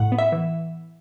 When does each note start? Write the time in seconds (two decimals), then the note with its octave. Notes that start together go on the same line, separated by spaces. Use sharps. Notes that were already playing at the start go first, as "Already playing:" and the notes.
Already playing: A2 F#5
0.12 B3
0.18 E5
0.32 E3